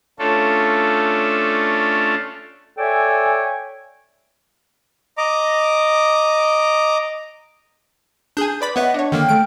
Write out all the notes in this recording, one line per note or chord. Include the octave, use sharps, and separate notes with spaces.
A3 C#4 D4 F4 A4
A4 C#5 D5 E5 G5 G#5
D#5 A#5 D6
D4 G#4 G#5 G6
B4 D5 B5
B3 B4 C#5 D#5 E5 F#5
D4 C#5
D3 D#3 A#3 G5 F6
A3 D7